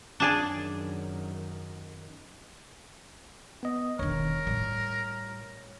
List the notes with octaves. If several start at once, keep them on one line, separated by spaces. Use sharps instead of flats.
F#2 D#3 D4 G#4 D5
B3 D#5
E1 D#3 A#4 C#5
A2 G3